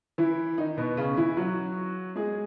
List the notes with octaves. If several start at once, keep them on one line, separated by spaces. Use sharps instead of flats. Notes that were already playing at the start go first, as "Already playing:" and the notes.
E3 E4
D#3 D#4
B2 B3
C#3 C#4
E3 E4
F#3 F#4
G#3 G#4